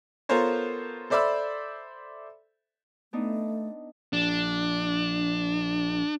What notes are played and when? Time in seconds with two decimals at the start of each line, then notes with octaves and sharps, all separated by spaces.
0.29 B3 F4 A4 A#4 C5 C#5
1.10 A4 C5 D5 E5 B5 E6
3.13 A3 B3 D4 D#4
4.13 A#1 D4